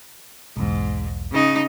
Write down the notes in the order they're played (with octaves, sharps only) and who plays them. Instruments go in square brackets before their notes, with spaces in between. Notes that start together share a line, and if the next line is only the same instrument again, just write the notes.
[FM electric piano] B1 E2 [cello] G#2
[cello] C#3 D#4